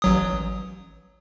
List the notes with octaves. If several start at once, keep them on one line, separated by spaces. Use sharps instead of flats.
A1 F#3 D#6